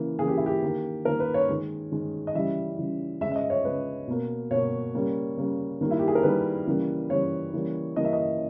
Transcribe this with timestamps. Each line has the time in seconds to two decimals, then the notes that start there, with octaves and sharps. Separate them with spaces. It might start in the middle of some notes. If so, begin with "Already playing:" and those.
Already playing: C#3 E3 A#3
0.19 C#3 E3 A#3 G#4
0.28 G4
0.37 E4
0.46 G4
0.62 D#3 A#3
1.05 D#3 A#3 A#4
1.20 B4
1.34 C#5
1.48 D#3 G#3
1.92 D#3 G#3
2.27 D#5
2.35 C#3 E3 G3 E5
2.78 C#3 E3 G3
3.21 G#3 E5
3.26 C#3
3.32 E5
3.36 D#5
3.50 C#5
3.64 C#3 G#3 B4
4.08 B2 A#3
4.51 B2 A#3 C#5
4.94 C#3 G3 A#3
5.37 C#3 G3 A#3
5.81 D#3 G3 A#3
5.91 E4
5.99 G4
6.08 G#4
6.15 A#4
6.23 D#3 G3 A#3 B4
6.67 C#3 E3 G3 A#3
7.10 C#3 E3 G3 A#3 C#5
7.53 C#3 E3 G3 A#3
7.96 C#3 E3 G3 A#3 D#5
8.05 E5
8.13 D#5